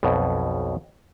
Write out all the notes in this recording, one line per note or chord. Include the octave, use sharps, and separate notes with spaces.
B1 F2 B2